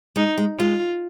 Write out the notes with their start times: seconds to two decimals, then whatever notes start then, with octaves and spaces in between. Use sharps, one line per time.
0.16 G#3 D#4
0.38 G#3
0.58 G#3 F4